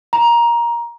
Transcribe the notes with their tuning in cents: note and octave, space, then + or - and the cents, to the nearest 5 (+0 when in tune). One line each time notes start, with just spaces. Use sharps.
A#5 +15